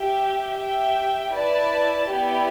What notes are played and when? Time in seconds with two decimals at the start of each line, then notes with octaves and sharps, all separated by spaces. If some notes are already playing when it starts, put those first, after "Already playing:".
Already playing: G4 E5 G5
0.57 G4 E5 G5
1.33 E4 B4 D5 A5
2.08 B3 E4 G4 D5